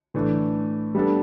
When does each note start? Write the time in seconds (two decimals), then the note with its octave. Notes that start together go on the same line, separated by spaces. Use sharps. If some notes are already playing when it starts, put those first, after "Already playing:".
0.14 A2 E3 A3 D4
0.95 G3 B3 D4 A4